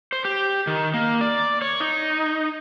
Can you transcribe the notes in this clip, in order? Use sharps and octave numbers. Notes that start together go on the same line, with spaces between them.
C5
G4
D#3
A#3
D5
C#5
D#4